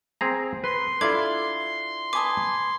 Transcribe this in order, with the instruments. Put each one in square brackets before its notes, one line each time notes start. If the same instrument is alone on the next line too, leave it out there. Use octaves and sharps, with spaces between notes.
[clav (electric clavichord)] C4 G#4 A#5
[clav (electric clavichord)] B4 [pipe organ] C6
[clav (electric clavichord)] D4 E4 F4 [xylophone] A4 D6 G#6
[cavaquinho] B4 G#5 A5 [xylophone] D6 D#6